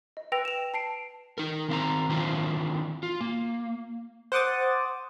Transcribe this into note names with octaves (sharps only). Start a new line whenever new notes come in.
D#5
B4 G5 E6 A#6 F7
E7 F7
A5 C7 D7
D#4 A#4
D#3 C4 F5 A#5
D#3 E3 C4 D4 D#4 F4
F4
A#3
C5 F#5 D6 D#6 A6